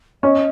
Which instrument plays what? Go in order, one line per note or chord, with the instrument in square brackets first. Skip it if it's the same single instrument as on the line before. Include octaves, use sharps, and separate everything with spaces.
[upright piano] C#4 [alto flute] D#5